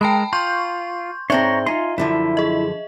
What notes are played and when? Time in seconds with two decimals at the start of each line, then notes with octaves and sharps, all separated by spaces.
0.01 G#3 A#4 G5 A5 B5
0.33 F4 C6 C#6 G6
1.30 G#2 C4 D4 C#5 E5 A#5
1.66 D#4 F4 G#5 C6
1.98 F#2 D3 F3 E4
2.37 G#4 D#5